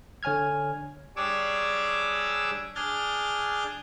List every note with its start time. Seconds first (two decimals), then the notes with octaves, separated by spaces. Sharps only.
0.23 D3 C#5 G#5 F6 G#6
1.16 G3 D4 G#4 C#5 D6 E6
2.75 D4 G#4 F6 G6 A6